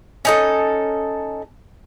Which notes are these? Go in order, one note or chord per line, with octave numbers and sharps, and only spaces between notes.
C#4 D#4 A4